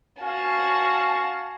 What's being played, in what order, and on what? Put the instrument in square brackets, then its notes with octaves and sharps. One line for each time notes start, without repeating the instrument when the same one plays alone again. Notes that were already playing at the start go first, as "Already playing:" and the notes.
[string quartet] F#4 A5 [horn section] F5 G#5